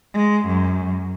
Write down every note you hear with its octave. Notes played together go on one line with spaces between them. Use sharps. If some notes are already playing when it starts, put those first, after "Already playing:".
G#3
F#2